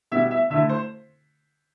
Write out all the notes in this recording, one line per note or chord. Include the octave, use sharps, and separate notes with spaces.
B2 G3 B3 E4 E5
E5
D3 A3 E4 E5
C5